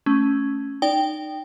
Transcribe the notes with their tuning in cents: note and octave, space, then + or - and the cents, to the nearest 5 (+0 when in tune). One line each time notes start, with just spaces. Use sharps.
A3 +0 C#4 +0
D#4 -20 D5 -15 G5 +0